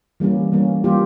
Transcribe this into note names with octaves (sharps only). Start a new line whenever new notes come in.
E3 G3 A#3 C#4
E3 G3 A#3 C#4
E3 G3 A#3 C#4 F4 G4